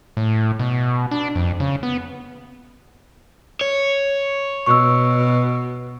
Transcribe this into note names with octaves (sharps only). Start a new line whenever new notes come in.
A2
B2
D4
F2
C#3
B3
C#5
B2 C#6 E6